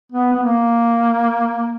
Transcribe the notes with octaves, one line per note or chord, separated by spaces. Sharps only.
B3
B3
A#3